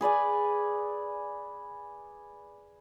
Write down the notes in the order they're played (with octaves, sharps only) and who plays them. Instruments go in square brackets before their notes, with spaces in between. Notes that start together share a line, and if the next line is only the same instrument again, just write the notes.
[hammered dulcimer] G#4 B4 D5 G#5